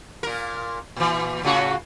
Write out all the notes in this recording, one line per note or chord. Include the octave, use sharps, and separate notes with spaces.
A#2 A#4
A#2 E3
A2 C#3 F#4